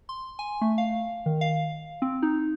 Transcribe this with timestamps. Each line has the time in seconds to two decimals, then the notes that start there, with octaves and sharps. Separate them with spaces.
0.09 C6
0.39 G#5
0.61 A3
0.78 F5
1.26 D#3
1.41 F5
2.02 C4
2.22 D#4